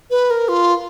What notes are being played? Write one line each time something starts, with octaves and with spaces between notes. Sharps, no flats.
B4
A#4
F4